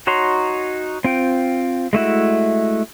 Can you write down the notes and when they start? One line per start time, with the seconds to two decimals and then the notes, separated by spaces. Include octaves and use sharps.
0.07 D#4 F#4 C#5 A#5 C6
1.05 C4 F4 G5
1.93 G#3 A3 E4 F#4